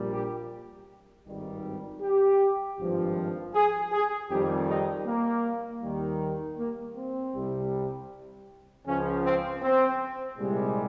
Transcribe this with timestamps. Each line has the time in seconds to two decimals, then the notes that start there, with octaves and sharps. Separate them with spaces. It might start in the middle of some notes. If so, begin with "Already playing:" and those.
Already playing: A#1 A#2 G3
0.13 G4
1.26 G#1 G2 D#3 G3
2.02 G4
2.79 G#1 G2 F3
3.55 G#4
3.92 G#4
4.30 F2 D#3 G3 G4
4.69 D#4
5.06 A#3
5.83 D#2 D#3 G3
6.59 A#3
6.97 C4
7.34 C2 C3 G3
8.87 C#2 C#3 F3 C#4
9.24 C4
9.62 C4
10.38 C2 A#2 G3 G#3